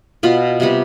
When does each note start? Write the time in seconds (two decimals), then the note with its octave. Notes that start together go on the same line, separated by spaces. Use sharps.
0.23 B2 B3 F4
0.60 C3 G3 B3